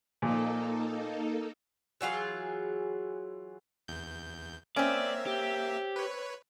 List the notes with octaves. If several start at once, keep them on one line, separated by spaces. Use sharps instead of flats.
A#2 F3 A#3 D#4 A4
E3 F#3 F4 G#4
E2 G6
A#3 C4 C#4 D5 E5
G4
B4 C#5